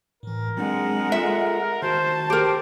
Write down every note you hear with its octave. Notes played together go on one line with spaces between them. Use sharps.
A2 E3 A#4
F#3 G#3 C4 D4 F#5
F4 A4 E5
D#3 F#4 C5 A5
G4 A#4 C5